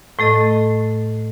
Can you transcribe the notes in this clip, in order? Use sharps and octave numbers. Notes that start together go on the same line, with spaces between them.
A2 A3 A4 D#5